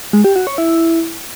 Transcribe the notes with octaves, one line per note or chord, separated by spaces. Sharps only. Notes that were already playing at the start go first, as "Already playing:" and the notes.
G#3
G4
F#4
C#5
E4